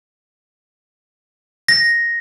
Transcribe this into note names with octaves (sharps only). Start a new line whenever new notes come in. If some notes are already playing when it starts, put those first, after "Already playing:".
A#6